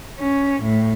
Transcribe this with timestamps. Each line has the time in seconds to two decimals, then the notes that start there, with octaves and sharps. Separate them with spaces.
0.20 C#4
0.64 A2